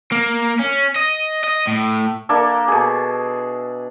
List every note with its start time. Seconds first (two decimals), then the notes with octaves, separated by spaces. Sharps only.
0.12 A#3
0.59 C#4
0.96 D#5
1.43 D#5
1.67 A2
2.29 A#3 D4 A4 E5
2.68 B2 G#4